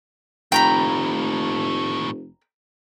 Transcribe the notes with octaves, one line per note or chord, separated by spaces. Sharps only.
F1 D#2 A2 G5 A#5 B5